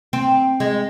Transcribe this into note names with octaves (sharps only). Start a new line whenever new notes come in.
C4
G#3